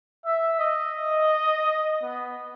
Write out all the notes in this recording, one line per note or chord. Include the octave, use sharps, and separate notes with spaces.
E5
D#5
B3